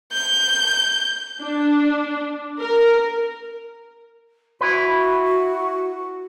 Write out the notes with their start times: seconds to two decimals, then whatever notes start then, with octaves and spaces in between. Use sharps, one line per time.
0.12 G6
1.42 D4
2.60 A#4
4.61 E4 F#4 B4